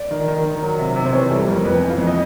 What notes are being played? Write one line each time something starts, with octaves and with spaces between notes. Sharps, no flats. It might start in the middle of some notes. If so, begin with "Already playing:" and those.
Already playing: D5
D#3
D#3
D#3
F#3
C3
C3
C5
E3 C#5
G3 A4
F2 A#4
F2 B4
E3
F5
F2
D#5